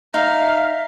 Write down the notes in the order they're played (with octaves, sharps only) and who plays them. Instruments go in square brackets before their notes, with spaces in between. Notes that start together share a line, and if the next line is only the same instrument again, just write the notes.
[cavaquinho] D#4 [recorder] E5 [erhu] F5